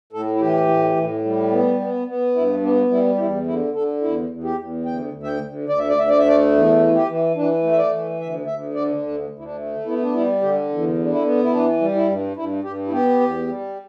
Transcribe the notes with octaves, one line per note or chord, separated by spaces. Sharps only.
A2 A4
E4
E3 G4
A2
A2
G3
B3
B3
B3
G2 E4
B3 D4
G3 E4
G4
E2 E4
D3 E4
D3 A4
E2 E4
E2
G4
E2
D2 G5
D2
E5
G5
D2
D2 D5
E5
D5
D2 E5
D5
E5
A3 D5
E2
E3
G4
E3
E3 D4
A3
E5
D5
E3
D2 E5
D2 E5
D3 D5
D2 D4
D2
E4
D4
A3
B3 E4
D4
G3 E4
D3 G4
E2
D3
E4
B3
E4
E3 D4
G3
E4
G2
G2 E4
G2 G4
E4
B3 G4
E2
G3